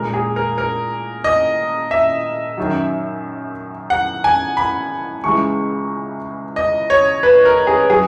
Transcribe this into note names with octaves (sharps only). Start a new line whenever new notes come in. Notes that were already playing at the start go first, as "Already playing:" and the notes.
Already playing: A#2 G#3 A#4
G#4
A#4
A#4
D#5
E5
F#2 D#3 F#3
F#5
G#5
B5
C#2 C#3 E3 G#3 C#6
D#5
C#5
B4
A#4
G#4
F#3 G#4